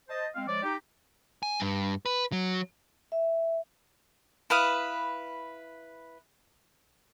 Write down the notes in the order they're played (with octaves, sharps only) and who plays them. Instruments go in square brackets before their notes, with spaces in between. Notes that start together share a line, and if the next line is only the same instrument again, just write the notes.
[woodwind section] C5 D#5 A5
G#3 C4 F5
F3 G#3 C#5 D5
D#4 G4
[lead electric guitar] G#5
G2
B4
F#3
[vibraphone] E5
[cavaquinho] E4 B4 F5 D#6